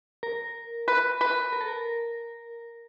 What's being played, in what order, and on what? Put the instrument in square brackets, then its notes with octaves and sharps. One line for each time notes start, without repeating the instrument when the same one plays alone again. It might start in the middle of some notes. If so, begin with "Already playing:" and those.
[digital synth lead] A#4
[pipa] B4
B4
[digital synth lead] A#4
A4
A#4